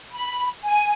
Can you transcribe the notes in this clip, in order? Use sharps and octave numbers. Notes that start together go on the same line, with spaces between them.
B5
G#5